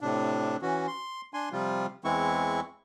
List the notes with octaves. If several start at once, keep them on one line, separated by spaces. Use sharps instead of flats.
A2 C3 D4
E3 C#4 F#4
C6
D4 G#5 C6
C3 F3 G3 F4
E2 E3 G#3 C4 E4 C#6